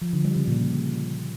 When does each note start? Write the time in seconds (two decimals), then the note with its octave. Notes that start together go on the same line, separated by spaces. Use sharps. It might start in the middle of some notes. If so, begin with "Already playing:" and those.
0.02 F3
0.13 D3
0.25 G3
0.36 C#3
0.48 A#2